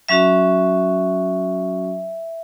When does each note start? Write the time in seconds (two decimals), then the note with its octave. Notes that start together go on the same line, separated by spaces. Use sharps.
0.09 F#3 C#4 F#4 E5